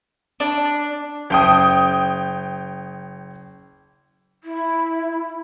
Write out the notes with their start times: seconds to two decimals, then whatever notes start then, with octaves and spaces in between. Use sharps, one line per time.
0.40 D4
1.30 F#1 G5 D#6
4.44 E4